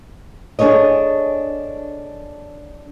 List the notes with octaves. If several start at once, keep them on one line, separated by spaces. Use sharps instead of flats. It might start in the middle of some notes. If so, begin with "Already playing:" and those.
D4 G#4 A4 C#5 D#5